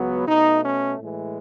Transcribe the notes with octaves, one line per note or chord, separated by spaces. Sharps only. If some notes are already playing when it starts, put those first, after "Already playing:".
Already playing: C#2 C#3 F#3 B3
B2 A3 D#4
C#4
A2 E3 G#3